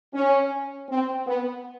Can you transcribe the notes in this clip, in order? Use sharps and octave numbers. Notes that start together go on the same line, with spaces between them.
C#4
C4
B3